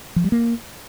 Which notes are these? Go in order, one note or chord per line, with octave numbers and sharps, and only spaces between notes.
F3
G3
A#3